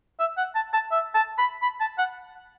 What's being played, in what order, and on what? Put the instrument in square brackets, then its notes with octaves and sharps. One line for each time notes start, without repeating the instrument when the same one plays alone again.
[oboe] E5
F#5
A5
A5
E5
A5
B5
B5
A5
F#5